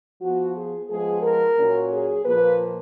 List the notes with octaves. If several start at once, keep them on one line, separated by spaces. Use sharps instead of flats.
F3 B3 F#4
G#4
F3 G#3 B3 G#4
A#4
A#2 F#3 C#4
G#4
A#2 F3 A#3 B4